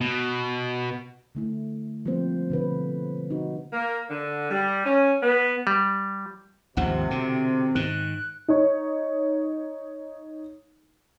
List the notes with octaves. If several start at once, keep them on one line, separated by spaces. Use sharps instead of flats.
B2
D3 A3 E4
F3 G3 A#3 C4 C5
B2 D3 B4
D#4 F#4
A#3
D3
G3
C#4
B3
G3
G#1 D#2 C3 F3 F#5
B2 D3 C4
G#2 D#3 F#6
D#4 C#5